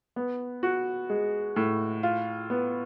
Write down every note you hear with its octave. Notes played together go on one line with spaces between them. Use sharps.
B3
F#4
G#3
A2
F4
B3